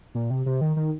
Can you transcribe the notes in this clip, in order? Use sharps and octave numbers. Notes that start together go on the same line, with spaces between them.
A#2
C3
C3
D#3
D#3